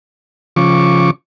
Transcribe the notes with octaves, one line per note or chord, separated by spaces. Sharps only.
C#3 F3 C#6 D6